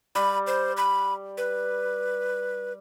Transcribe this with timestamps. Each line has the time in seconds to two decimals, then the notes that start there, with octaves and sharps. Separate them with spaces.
0.15 G3 B5
0.47 C5
0.77 B5
1.37 B4